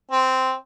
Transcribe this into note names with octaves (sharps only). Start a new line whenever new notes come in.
C4